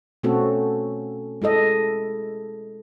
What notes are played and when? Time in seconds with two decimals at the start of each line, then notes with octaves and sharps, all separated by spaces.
0.23 B2 A3 C4 C#4 F#4 A4
1.42 G#3 E4 A4 D#5